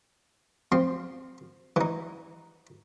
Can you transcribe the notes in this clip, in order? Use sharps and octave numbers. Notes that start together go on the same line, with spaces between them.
F3 C4 C6
E3 D#4